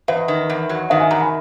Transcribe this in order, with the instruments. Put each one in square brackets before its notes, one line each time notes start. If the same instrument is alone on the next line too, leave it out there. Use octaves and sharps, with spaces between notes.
[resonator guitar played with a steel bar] E2 [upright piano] B4 D#5
[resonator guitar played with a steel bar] D#3
E2
F#3
[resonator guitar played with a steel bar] D#3 [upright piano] D#5 F#5
[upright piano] E5 G#5
[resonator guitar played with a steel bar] E2 [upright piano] F#5 A#5
[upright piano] G#5 B5